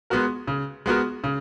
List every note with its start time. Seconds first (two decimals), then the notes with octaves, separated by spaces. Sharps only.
0.10 G#3 B3 F#4 A#4
0.48 C#3
0.86 G#3 B3 F#4 A#4
1.24 C#3